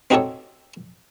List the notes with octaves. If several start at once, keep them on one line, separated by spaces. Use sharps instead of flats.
C4 D#4 F#4 G4 A4 C#5